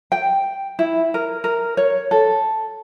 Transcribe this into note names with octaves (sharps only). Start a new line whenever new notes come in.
G5
E4
A#4
A#4
C#5
A4